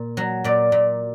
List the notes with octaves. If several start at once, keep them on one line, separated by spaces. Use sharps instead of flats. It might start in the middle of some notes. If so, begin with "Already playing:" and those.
Already playing: A#2
F#3
A#2 D5
A#2